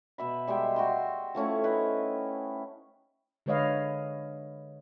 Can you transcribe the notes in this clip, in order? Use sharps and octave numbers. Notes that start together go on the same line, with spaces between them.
B2 E5 B5
G3 G#3 E5 G5
F#4 G5 C6
F3 A3 C#4 E4
D#4 E4 B4
D3 G#3 B4 C#5 D#5 F5